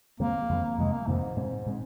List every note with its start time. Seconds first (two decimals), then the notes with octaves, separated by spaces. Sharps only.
0.19 F2 D#3 G#3 A#3 C4
0.49 F2 D#3 G#3 C4
0.78 F2 C3 D#3 G#3
0.93 A#3
1.07 F2 G#2 C3 D#3
1.36 A#2 G#3 C4
1.66 A#2 G#3 C4